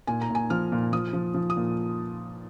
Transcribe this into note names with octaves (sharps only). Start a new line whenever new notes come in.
A#2 G#5
A#5
A#2
G#5
F3 F6
A#2
F3 D#6
F3
F3
D#6
A#2